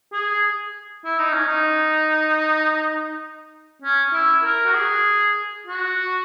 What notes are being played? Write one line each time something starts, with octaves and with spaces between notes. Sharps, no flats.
G#4
E4
D#4
C#4
D#4
C#4
E4
A#4
F#4
G#4
F#4